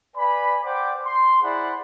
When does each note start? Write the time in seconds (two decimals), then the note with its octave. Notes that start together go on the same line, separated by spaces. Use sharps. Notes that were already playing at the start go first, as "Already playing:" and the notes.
0.15 B4 D5 G#5 B5
0.64 C5 D5 F#5 G5 D6
1.04 C6
1.42 E4 G#4 C5 D5 F#5 B5